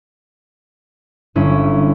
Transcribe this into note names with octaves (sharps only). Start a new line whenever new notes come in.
G1 C#4 E4